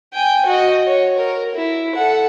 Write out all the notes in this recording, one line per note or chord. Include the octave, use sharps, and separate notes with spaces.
G5 G#5
F#4 D#5
C#5
A#4
E4
A4 F#5